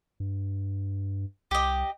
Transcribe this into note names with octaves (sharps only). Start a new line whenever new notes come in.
G2
C2 G4 D#5